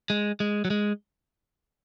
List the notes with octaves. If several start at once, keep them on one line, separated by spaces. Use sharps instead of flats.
G#3
G#3
F#3
G#3